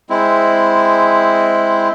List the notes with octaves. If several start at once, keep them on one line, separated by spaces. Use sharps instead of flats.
G#3 C4 E4